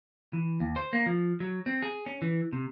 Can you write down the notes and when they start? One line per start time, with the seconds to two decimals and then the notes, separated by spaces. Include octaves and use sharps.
0.33 E3
0.60 D#2
0.76 C5
0.93 A#3
1.06 F3
1.40 F#3
1.66 C4
1.82 G#4
2.06 C#4
2.22 E3
2.53 C3